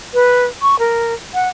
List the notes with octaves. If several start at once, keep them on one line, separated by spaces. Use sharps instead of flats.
B4
C#6
A#4
F#5